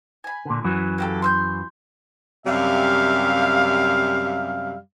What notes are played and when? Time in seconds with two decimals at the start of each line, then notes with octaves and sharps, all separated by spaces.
0.24 G#5 B5
0.45 A#2 D3
0.64 F#2 E3 F#3
0.98 A#3 G4 A4
1.22 C6 E6 G6
2.47 F#2 C3 G3 E5 F5